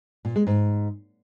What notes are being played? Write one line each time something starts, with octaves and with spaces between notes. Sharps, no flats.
A#2
G#3
G#2